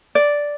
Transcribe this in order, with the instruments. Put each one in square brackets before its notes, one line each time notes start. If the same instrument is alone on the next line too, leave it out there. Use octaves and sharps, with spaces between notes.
[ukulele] D5